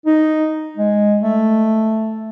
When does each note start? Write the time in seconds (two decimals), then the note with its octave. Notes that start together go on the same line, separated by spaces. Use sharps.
0.06 D#4
0.77 G#3
1.21 A3